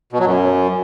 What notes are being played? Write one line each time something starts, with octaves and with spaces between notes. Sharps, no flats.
B2
F#3
F#2